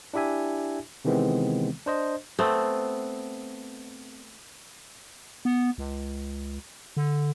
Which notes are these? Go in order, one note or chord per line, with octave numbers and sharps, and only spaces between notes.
D4 E4 G4 E5 G#5
C3 D#3 E3 G#3 B3 C4
D4 C5 D#5
A3 B3 C4
B3
C#2
D3